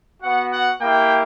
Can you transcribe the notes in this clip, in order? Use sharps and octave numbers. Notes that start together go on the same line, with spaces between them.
B3 F#4 F#5
F#5
A#3 E4 G4 G5